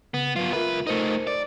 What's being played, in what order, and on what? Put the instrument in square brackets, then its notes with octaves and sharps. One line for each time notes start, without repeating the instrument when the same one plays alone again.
[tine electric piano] C#3 [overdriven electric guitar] B3
[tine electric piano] F#3 B4 [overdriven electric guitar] B3 F4
[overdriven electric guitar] C#2 B4 [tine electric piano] F4 A#4 E5
[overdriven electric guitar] A3 D#4 [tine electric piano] A#4 C5 C#7
[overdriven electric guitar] D5